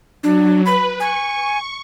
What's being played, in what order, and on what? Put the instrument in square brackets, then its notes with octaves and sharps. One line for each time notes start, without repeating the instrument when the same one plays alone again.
[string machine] F#3 [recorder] D4
[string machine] B4 [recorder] B5
[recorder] G#5 [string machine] C#6